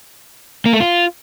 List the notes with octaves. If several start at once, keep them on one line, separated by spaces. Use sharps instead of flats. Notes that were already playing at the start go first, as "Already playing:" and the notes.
A#3
A3
F4